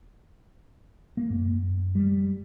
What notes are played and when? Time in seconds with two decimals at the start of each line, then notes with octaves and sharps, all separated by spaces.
1.17 A#3
1.30 F#2
1.95 G3